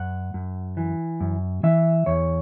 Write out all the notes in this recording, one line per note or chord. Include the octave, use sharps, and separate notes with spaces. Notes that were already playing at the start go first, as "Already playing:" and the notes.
Already playing: F#2 F#5
F#2
E3
F#2
E3 E5
E2 C#5